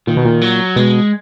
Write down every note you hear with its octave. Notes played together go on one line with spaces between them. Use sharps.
A#2 D#3
B2
A#2
F#3
B2 G#3